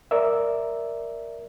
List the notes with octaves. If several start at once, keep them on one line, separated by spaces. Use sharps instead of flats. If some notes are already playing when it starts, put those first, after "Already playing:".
A#4 D5 E5